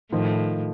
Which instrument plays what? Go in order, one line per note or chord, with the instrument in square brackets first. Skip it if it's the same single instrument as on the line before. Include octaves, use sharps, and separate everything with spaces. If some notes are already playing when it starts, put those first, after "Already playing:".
[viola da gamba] A2 [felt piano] D#3 F3